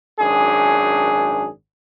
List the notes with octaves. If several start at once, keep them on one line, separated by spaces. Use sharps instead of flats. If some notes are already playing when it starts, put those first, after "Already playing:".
G#1 F#2 D4 G#4